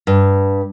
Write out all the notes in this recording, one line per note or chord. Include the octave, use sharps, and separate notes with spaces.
G2